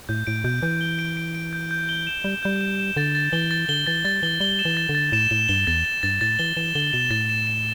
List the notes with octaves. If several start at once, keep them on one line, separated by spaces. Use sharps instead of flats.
A2 G6
A2 D7
B2 G6
E3 G6
G7
D7
D7
D7
G6
G6
G7
E7
G3 G6
G3 G6
E7
E7
D3 A6
A6
E3 G7
A6
D3 G7
E3 A6
G3 A6
E3 G7
G3 G7
E7
E3
A6
D3
A6
A2 E7
A2 E7
G2 G7
E2 A6
E7
G2 A6
A2 A6
E3 G7
E3 E7
D3 G7
B2 E7
A2 A6
E7
E7